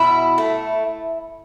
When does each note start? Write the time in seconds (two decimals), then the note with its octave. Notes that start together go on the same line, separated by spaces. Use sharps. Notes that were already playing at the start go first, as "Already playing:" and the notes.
Already playing: B2 E4
0.38 A3